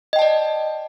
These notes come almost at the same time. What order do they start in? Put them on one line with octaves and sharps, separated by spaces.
D#5 G5 A5 D5